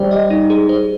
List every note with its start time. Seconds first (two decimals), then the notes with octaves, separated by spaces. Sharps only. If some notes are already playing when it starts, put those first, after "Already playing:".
Already playing: G3 C5
0.11 D#5
0.30 D#4
0.50 G#4
0.69 C5